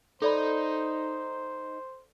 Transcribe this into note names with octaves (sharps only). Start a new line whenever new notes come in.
D#4 A4 C5 D5 B5